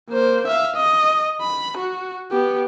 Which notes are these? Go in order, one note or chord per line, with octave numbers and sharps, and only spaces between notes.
A#3 C5
E5 F5
D#5
B5
F#4
B3 G4